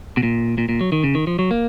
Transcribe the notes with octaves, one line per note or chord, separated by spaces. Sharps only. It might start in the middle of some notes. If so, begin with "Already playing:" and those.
B2
A#2
A#2
A#2
F#3
D#3
C#3
D#3
F3
F#3
A#3